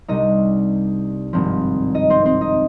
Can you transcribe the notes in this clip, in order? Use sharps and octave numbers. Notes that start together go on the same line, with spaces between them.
C2 C3 G3 D4 D#4 D#5
G#1 G2 F3 C4
D#4 D#5
C4 C5
C4 C5
D#4 D#5